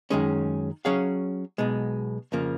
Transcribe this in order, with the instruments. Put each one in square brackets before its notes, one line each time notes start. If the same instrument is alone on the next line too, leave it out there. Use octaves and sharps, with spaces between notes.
[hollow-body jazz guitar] F#2 D#3 G#3 C#4 G#4
F#3 C#4 G#4 C#5 F5
B1 B2 G#3
F2 C#3 F3 A#3